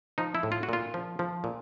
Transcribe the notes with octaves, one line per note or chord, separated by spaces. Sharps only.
F3 D#4
E4
A2
F4
F#4
A#2 F4
F3
F3
A#2